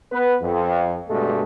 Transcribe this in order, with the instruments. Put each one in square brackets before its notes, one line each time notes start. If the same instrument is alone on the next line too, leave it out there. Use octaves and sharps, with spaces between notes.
[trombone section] B3 B4
F2
G2 B2 G#3 A3